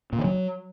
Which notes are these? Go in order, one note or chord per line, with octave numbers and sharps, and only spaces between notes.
A#2
D3
F#3